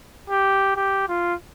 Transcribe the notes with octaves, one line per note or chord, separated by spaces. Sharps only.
G4
G4
F4